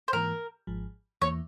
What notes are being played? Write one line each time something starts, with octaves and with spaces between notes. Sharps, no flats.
C5
G#2 E3 A#3 A#4
G#1 G#2 F3
E2 E3 A#3 C#5